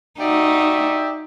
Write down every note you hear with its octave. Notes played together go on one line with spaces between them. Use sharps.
D#4 F#4 G4 D5 E5